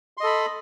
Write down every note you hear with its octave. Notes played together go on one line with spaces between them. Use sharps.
A4 D#5 B5 C6